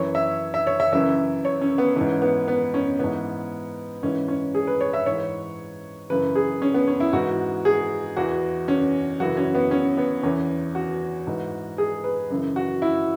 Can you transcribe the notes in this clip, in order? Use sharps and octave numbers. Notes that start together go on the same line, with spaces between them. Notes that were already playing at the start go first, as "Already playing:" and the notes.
Already playing: F#2 E3 C#5
E5
E5
C#5
E5
F#2 C#3 E3 E5
C#5
C#4
B3
G#2 E3 C#4
B3
B3
C#4
G#2 E3 B3
G#2 E3 C#4
C#4
G#4
B4
C#5
E5
G#2 E3 C#5
F#2 C#3 E3 B4
G#4
C#4
B3
C#4
E4
G#2 E3 F#4
G#4
E2 E3 F#4
C#4
F#2 C#3 E3 F#4
C#4
B3
C#4
B3
E2 E3 C#4
F#4
G#2 E3
G#4
B4
F#2 C#3 E3
F#4
E4